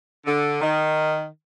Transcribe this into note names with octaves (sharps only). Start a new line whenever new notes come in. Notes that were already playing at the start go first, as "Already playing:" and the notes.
D3
D#3